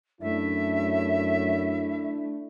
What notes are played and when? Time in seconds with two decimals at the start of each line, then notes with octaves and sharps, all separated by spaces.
0.21 F#2 A3 D4 E4 E5